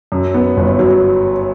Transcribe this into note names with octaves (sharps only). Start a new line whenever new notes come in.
F#2
B3
G1
F#3